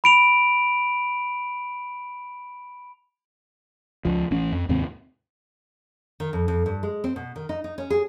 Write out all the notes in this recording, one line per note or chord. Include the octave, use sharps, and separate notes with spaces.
B5 D7 F7
C#2 F3
A1 C#4
F2
D#2 G#2 C3 C4
D#3
F2
F2
G2
G#3
C4
B2
D#3
D#4
D#4
C#4
G#4